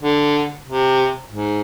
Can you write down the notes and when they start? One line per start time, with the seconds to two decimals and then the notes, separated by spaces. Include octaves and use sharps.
0.01 D3
0.65 C3
1.29 G#2